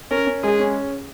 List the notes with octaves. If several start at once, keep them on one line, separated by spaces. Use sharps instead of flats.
C#4 A#4
C#4
G#3 G#4
C#4